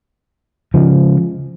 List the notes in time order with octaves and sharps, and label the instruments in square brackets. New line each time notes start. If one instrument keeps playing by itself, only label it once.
[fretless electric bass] C#3 F3 G#3